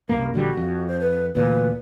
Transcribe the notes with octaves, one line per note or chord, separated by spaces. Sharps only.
C2 F#2 A#3 A#4
A#1 D3 G3 F#4
F2
C5
B4
D2 A#2 E3 B4